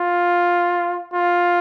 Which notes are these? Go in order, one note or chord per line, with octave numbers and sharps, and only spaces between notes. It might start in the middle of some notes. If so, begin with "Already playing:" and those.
Already playing: F4
F4